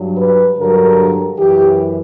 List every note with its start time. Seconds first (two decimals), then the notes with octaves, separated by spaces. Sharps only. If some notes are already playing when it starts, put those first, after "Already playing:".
Already playing: G2 F#3
0.16 B4
0.57 G2 D3 F#3 A#4
1.37 F#2 E3 G4